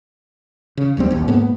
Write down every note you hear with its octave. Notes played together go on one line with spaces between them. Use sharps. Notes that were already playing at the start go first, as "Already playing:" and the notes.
C#3
F1 D#2 G3 C4
D#1 A#1 D#2
G#2 A#3 B3